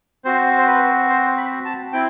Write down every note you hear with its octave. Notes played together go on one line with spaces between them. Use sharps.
C4 F#4 C5
C5
B4
C5
B5
A5
C4 E4 G5